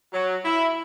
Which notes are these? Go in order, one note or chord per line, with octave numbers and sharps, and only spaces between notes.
F#3
E4